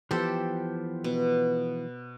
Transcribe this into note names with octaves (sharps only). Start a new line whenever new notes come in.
E3 F3 B3 G4 A4 C5
B2